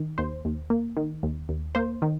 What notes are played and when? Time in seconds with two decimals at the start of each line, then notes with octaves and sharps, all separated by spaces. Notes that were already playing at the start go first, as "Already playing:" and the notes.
Already playing: D#3
0.18 D#2 C5
0.45 D#2
0.70 A#3
0.97 D#3
1.23 D#2
1.49 D#2
1.75 A#3 C5
2.02 D#3